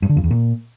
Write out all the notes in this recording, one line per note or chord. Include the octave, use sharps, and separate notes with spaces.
G2
D3
F2
E2
A#2